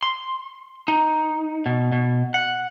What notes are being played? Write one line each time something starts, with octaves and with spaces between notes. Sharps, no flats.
C6
D#4
B2
B2
F#5